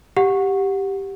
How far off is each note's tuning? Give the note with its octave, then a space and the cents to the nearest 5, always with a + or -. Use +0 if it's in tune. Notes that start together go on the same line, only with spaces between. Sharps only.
G4 +0 F#5 -20